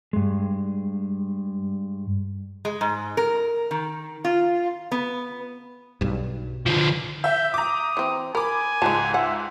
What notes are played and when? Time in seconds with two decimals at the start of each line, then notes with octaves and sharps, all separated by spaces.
0.13 G2 G#3
2.65 G#3
2.81 G#2
3.17 A#4
3.71 D#3
4.24 F4
4.92 B3
6.01 B1 G2
6.66 D3 F3
7.24 E5 G6
7.54 A#5 D6 D#6
7.97 E3 C4
8.35 A#4 G#5 B5 D6
8.82 C#2 G#2 G#3 A5
9.14 E5 F#5